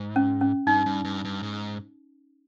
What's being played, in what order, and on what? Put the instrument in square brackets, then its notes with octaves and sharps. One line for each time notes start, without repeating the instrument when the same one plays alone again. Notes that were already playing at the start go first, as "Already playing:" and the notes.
Already playing: [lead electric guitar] G#2
[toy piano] C#4
C#4
[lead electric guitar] G2 [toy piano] D#4
[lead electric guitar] G2
G2
G2
G#2